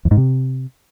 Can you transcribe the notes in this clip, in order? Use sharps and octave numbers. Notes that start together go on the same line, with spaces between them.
E2
G#2
C3